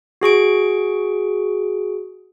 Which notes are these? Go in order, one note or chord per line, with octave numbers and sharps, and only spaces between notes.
F#4 G#4 C#6 D7